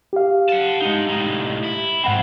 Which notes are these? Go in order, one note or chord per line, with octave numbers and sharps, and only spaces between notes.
G4 F5
F#5 A5
G#3 D#4
A2 D#4
E4
G#2 F3 C4 F#5 B5